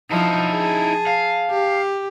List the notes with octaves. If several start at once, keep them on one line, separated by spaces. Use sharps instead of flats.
F3 D#4 E4 A5
G#4
F5
G4